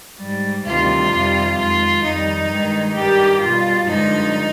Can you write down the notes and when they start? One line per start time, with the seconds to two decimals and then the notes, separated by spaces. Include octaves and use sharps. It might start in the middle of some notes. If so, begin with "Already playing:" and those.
0.19 G#2 G3
0.65 D2 C3 D#3 G3 F4
1.11 F2 C3 D#3 G3
1.57 F2 D#3 G#3 F4
2.03 F2 D#3 G3 D#4
2.49 G2 D#3 G#3
2.95 G2 D#3 G3 G4
3.41 B2 G3 F4
3.87 G2 D3 F3 G#3 D#4